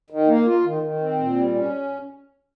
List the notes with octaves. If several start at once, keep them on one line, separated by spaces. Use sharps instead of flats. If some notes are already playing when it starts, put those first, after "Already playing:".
D#3
A#3
F4
D#3
D#3
C4
A#2
G3
C#4